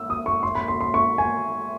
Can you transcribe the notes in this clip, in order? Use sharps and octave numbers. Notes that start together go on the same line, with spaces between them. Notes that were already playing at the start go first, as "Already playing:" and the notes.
Already playing: E6
D#6
C#6
C6
B5
C6
C6
C#6
G#5